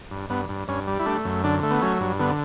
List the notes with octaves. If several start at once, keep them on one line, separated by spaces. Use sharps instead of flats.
G2
G2 B3
G2
G2 C#4
G3
E4
A3 D4
F#2
D3 D4
A3
B3
F#3 C#4
G2
D3 B3